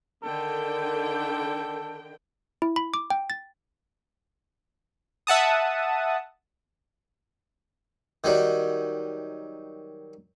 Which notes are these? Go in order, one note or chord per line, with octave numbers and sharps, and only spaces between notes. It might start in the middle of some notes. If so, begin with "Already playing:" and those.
D3 D#3 A4 G5
E4
B5
D6
G5
A6
E5 F#5 A5 D#6
D#3 F#3 G3